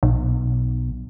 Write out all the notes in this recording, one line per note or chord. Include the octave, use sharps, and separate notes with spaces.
B1